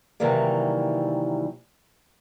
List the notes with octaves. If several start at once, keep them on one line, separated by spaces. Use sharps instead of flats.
C3 D#3 E3 F#3 G3 A#3